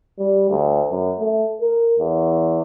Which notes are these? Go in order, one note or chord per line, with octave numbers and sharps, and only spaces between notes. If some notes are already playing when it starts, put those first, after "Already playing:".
G3
D2
F#2
A3
A#4
E2